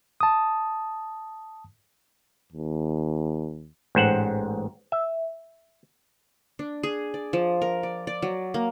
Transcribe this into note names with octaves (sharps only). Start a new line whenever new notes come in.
A5 D#6
D#2
A1 G#2 C5 F#5
E5
D4
G#4
D5
F3
A#4
D5
D5
F#3
A#3